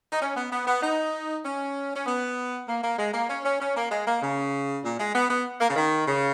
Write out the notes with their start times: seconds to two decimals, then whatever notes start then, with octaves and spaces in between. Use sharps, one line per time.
0.12 D#4
0.21 C#4
0.36 B3
0.52 B3
0.67 B3
0.82 D#4
1.44 C#4
1.96 C#4
2.06 B3
2.68 A#3
2.83 A#3
2.98 G#3
3.14 A#3
3.30 C#4
3.45 C#4
3.60 C#4
3.76 A#3
3.91 G#3
4.07 A#3
4.22 C#3
4.84 A#2
4.99 G#3
5.14 B3
5.30 B3
5.61 A#3
5.70 C#3
5.76 D#3
6.07 C#3